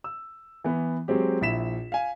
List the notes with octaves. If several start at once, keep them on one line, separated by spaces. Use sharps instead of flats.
E6
E3 B3
F#3 G#3 C4 G4
A#1 E4 B6 E7
F5 G#5